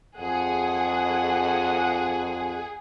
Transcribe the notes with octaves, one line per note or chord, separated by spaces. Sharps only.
F2 G#4 F#5